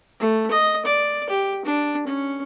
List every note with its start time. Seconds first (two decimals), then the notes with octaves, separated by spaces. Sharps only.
0.20 A3
0.51 D#5
0.86 D5
1.30 G4
1.65 D4
2.07 C#4